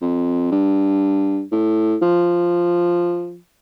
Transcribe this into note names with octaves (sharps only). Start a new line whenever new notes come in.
F2
G2
A2
F3